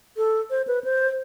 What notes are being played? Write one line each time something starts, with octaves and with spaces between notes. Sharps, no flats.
A4
C5
B4
C5